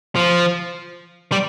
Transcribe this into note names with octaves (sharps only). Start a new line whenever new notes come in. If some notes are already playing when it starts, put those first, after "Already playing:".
F3
G3